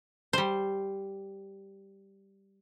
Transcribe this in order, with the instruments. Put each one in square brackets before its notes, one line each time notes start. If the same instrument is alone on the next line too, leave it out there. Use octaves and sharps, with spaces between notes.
[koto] G3 C5